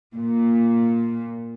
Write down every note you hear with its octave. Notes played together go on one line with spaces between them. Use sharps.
A#2